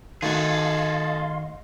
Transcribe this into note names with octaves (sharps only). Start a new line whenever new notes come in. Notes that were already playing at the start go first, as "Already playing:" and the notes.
D#3 A3 F#4 G#4 A4 D#5 F5 C6